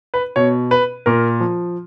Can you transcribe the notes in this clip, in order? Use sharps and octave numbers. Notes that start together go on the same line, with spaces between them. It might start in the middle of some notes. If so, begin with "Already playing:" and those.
B4
B2 C#5
B4
A#2 A#4
F3